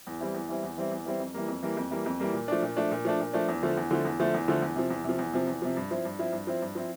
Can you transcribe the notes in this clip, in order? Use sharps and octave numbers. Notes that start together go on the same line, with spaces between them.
E2
E3 G3 C4 E4
E2
E3 G3 C4 E4
E2
E3 G3 C4 E4
E2
E3 G3 C4 E4
F2
E3 G3 A#3
F2
E3 G3 A#3
F2
E3 G3 A#3
F2
E3 G3 A#3
A#2
F3 A3 D4
A#2
F3 A3 D4
A#2
F3 A3 D4
A#2
F3 A3 D4
E2
D3 F3 A3
E2
D3 F3 A3
E2
D3 F3 A3
E2
D3 F3 A3
E2
C3 F3
E2
C3 F3
E2
C3 F3
E2
C3 F3
G2
F3 C4 E4
G2
F3 C4 E4
G2
F3 C4 E4
G2
F3 C4 E4